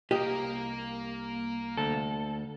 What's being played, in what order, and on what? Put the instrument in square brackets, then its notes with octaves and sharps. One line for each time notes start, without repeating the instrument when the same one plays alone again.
[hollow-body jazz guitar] C2 G4 D#5 [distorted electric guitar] A#3 A#4
[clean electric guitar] D2 [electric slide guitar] A4